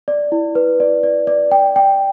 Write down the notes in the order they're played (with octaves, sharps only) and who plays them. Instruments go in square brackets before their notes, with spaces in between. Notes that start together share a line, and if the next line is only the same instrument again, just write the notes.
[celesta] D5
E4
B4
D5
D5
D5
G5
G5